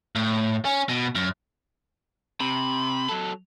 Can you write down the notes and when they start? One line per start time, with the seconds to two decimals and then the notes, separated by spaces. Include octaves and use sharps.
0.15 A2
0.65 C#4
0.89 B2
1.15 F#2
2.40 C3 B5
3.09 F#3 A4